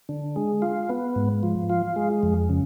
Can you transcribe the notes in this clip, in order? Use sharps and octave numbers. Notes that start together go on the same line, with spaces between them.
D3
G#3
F4
B3
G#2
F3
F4
G#3
F2
C#3